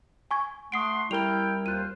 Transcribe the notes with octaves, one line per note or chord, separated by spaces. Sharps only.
G#5 C#6 G#6
A3 F#5 C6 D#6 C7 D7
G3 E4 A#4 G5 F6 F7 G7
D#2 F4 C5 F#6 D#7